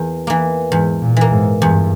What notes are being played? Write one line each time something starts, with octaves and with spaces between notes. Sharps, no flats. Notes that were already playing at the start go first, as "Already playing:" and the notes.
Already playing: E2 A#3
E3 A#3
E2 G#2
A#2
E3 A#3
G#2
E2 G2